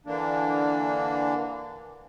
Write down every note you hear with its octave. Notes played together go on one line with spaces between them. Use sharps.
D3 E3 A#3 D4